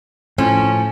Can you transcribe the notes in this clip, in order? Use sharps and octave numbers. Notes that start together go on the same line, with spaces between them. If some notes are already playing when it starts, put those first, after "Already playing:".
A2 F3 C#4